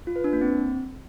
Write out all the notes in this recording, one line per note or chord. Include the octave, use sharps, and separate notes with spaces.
F4
B4
D4
A#3
C4